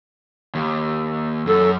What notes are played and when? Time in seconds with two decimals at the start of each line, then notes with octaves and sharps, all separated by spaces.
0.55 D#2
1.47 F#2 A4